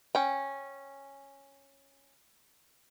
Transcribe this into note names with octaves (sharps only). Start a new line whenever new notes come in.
C#4 G5